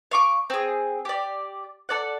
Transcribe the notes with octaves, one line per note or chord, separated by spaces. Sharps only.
F5 C#6 D6
C4 G#4
G4 D5
A4 D5 F#5